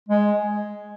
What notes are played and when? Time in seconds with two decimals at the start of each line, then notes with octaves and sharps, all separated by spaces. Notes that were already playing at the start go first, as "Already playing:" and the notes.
0.09 G#3